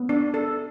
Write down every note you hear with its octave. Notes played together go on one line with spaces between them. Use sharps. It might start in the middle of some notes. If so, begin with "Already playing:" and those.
Already playing: B3
D4
A4